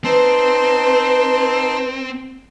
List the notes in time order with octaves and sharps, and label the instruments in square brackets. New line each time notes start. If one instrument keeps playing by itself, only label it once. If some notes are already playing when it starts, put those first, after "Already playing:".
[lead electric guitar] C4 [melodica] D#4 A5 C6 [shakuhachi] B4